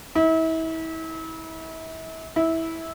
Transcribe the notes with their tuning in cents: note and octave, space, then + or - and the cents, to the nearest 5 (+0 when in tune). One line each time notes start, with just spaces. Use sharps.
E4 -35
E4 -15